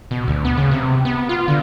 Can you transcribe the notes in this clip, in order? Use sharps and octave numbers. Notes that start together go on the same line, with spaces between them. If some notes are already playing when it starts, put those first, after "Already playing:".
B2
D2
B3
C#3
C3
B3
F4
D3